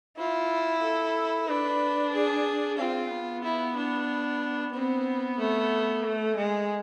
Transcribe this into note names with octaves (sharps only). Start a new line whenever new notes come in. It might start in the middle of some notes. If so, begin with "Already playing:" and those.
E4 F4
A4
D4 B4
G#4
C4 F4
B3
E4
D4
B3 C4
A3
A3
G#3